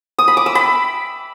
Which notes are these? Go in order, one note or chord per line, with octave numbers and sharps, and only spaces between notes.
D#6
B5
D6
E6
B5